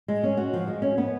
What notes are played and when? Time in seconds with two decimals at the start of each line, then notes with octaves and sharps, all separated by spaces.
0.08 G#3
0.23 C#4
0.37 F#4
0.53 F3
0.68 G#3
0.82 C#4
0.98 B3